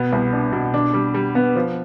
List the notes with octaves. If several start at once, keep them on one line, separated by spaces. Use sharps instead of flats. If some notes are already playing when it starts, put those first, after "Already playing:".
Already playing: B2 B3
C2
D4
B2
D4
G3
G3
B3
F3